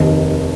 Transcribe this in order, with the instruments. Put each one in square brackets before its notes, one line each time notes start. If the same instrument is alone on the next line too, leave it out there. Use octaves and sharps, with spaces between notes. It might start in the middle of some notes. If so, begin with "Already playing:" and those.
Already playing: [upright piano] F1 D#2 D#3